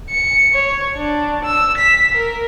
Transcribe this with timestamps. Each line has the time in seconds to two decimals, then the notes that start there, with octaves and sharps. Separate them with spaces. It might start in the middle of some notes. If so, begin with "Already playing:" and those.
0.10 C#7
0.54 C#5
0.96 D4
1.45 E6
1.77 B6
2.14 A#4